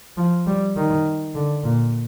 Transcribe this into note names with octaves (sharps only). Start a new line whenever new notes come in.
F3
G3
D#3
D3
A#2